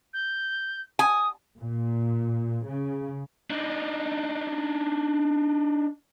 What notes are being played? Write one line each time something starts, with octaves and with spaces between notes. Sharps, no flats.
G6
G#5 D#6
A#2
C#3
D4 D#4